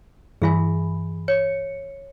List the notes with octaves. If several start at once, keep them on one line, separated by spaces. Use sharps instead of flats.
G2 E3 G#4 E5 G#5 B5
C#5 C#7